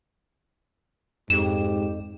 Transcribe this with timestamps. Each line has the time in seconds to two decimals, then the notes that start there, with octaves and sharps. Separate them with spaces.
1.30 F2 G#2 G4 E7